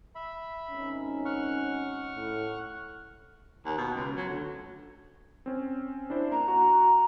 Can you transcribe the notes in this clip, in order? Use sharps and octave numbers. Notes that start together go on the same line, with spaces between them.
E5 B5
G#1 C#4 D#4
F#5 C#6 F6
A2
D#2
B2
C#2
F#3
D2
C4 C#4
D4 E4 C5
A#3 A#5
F#4